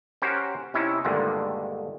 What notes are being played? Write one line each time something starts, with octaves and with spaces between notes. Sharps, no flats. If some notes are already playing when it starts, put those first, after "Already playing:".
C#4 F#4 G4 A#4 C5 F#5
C3 C#4 D#4 E4
G2 A#2 D3 D#3 G#3 A3